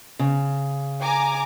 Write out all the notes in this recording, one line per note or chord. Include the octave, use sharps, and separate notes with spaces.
C#3
G#5 A#5 D6